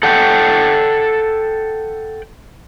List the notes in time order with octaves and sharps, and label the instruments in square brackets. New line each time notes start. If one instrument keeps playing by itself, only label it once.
[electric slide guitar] A4 F#5 G5